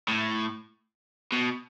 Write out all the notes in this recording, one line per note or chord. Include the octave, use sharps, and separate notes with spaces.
A2
B2